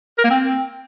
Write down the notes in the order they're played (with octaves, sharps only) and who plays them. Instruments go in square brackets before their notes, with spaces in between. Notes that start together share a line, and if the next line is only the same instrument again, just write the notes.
[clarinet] A#4
A#3
C4